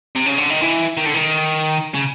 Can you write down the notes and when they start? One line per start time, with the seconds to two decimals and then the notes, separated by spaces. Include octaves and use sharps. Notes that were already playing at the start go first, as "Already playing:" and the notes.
0.16 C3
0.26 C#3
0.38 D3
0.50 D#3
0.61 E3
0.97 D#3
1.06 D3
1.14 D#3
1.94 C#3